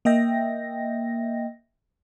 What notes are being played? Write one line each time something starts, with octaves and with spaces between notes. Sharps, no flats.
A#3 D#5 E5 G5 A#6